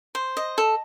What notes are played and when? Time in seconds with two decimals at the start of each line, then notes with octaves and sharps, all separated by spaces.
0.15 C5
0.37 D#5
0.58 A4